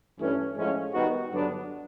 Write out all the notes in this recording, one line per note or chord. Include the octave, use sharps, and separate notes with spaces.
G2 E3 A3 C#4
A2 F3 G#3 C#4
D#3 G3 B3 D#4 F#4
G2 D3 F#3 B3 D4